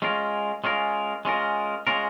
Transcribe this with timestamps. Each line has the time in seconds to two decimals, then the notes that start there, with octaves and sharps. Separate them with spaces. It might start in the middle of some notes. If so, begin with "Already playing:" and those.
0.02 G#3 C#4 F4 A#4
0.64 G#3 C#4 F4 A#4
1.25 G#3 C#4 F4 A#4
1.87 G#3 C#4 F4 A#4